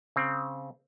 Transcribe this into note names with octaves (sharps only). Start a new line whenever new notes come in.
C#3 C4